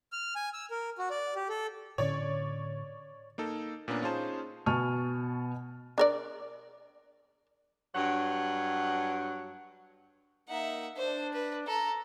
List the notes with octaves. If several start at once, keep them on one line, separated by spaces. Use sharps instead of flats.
F6
G#5
E6
A#4
F#4
D5
G4
A4
A2 D3 C#4 C#5 D5
A#3 D#4 A4
A#2 A#3 B3 C#4 D4
C#4 D#4 F4 G#4 C5 A5
B2 G#5 A5 C#6 F6 D#7
D4 A#4 D5
G2 F#3 C#5 F#5
A#3 D#4 E5 F#5
D4 C5
B4
A4 A#5